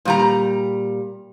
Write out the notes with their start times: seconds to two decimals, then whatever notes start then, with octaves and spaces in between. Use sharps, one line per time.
0.05 A#2 G3 A#5